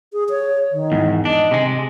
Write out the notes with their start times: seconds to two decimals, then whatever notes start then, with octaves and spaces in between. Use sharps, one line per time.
0.13 G#4
0.30 C#5
0.72 D#3
0.92 E2 G#2
1.25 D4 D#5
1.51 C3 G#3